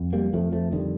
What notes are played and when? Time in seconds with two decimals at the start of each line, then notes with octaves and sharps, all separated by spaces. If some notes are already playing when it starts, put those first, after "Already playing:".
Already playing: F2
0.13 G3 A#3
0.33 F2 F3 A3
0.52 F3 A3
0.72 D3 D#3 G3